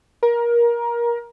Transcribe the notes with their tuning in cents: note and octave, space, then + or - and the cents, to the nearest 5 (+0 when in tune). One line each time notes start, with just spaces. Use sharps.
A#4 +20